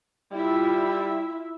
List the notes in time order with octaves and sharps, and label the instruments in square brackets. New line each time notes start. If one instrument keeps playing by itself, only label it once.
[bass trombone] G3 [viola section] E4 F4 E5